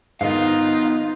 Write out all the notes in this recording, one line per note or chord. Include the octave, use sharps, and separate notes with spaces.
G#2 D#3 B3 D#4 F4 B4 F5